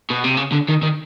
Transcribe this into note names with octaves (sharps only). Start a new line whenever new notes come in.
B2
C3
C#3
D3
D#3
D#3